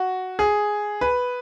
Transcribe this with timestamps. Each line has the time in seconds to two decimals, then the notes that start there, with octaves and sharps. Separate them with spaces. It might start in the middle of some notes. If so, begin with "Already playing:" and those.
Already playing: F#4
0.39 G#4
1.01 B4